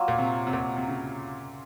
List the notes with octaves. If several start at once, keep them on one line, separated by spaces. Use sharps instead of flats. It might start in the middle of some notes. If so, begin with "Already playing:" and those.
Already playing: F#3 A#3 F4
A#2
C3
C3
A#2
C3
C#3